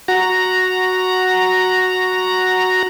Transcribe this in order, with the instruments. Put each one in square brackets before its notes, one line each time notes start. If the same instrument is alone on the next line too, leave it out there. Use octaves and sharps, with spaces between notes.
[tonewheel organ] F#4 A#5